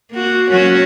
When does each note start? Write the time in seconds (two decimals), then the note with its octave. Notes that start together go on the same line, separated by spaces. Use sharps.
0.11 A#3 F#4
0.51 F#3 C#4 F#4